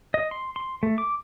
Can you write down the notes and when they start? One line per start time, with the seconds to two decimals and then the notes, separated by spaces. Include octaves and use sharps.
0.14 D#5
0.31 C6
0.56 C6
0.83 A3
0.98 D6